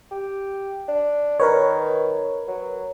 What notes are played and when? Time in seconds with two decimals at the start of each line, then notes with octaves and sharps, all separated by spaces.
0.11 G4
0.88 D4
1.40 D#3 A#4 B4 C#5
2.48 F#3